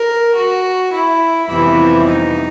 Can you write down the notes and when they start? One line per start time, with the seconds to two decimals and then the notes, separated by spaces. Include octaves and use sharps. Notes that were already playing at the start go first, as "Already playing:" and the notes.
Already playing: A#4
0.35 F#4
0.92 E4
1.48 F2 C3 E3 G3 B3 E4
2.05 D#4